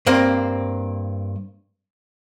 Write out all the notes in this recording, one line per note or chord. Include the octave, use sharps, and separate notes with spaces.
G2 A#3 C4